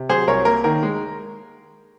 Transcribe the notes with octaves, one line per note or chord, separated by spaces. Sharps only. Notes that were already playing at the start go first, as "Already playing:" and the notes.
Already playing: C3
F#3 G#4 C5
C2 A#4 C#5
A#3 A#4
D#3 A#4
G#3